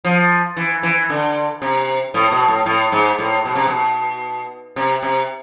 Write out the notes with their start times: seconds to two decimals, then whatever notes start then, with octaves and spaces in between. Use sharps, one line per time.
0.05 F3
0.57 E3
0.83 E3
1.09 D3
1.62 C3
2.14 A2
2.32 B2
2.48 A2
2.66 A2
2.92 G#2
3.19 A2
3.45 B2
3.55 C3
3.67 B2
4.76 C3
5.03 C3